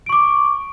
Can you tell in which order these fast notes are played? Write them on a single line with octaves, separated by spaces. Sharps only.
D7 C#6 D6